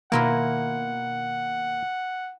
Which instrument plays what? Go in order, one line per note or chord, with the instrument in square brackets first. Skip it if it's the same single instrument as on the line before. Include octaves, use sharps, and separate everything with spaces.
[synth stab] B2 D#3 [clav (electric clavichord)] A#3 [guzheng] E4 F4 A#4 [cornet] F#5